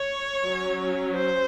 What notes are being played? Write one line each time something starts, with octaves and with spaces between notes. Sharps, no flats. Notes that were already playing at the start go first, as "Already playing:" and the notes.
Already playing: C#5
F#3 C#4
C5